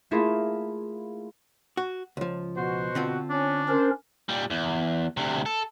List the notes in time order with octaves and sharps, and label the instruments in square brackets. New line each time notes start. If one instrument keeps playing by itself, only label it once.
[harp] A3 A#3 E4 F4 G#4 A#4
[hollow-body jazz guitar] F#4
C#2 F3
[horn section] B2 F#4 [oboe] C5
[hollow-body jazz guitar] D3 C4 F4
[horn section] C#4 [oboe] D4
[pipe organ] C#4 A#4 [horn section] C5
[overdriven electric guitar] A#2 G3
E2
D2 C3
A4